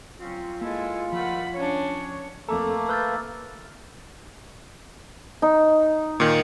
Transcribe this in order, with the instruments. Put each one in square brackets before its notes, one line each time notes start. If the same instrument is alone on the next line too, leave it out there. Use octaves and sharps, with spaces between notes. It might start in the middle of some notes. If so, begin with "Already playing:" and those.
[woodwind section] F#3 C4 C#4 [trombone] F4
[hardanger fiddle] G#3 [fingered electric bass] A#3 [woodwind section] E4 A4
[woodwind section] D#3 G3 A3 [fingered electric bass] F3 [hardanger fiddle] F#5 B5
[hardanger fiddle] C#4 D4 [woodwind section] C#5
[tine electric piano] F2 A4 [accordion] A3 A#3 [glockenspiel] A#5 D6
[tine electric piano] B4 G6 [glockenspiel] E6 F6 A6
[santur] D#4
[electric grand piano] A#2 D#3